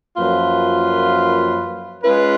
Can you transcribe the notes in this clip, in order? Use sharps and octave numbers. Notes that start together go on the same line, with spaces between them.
F#2 F3 A#3 F4 B4
G#3 C#4 F4 B4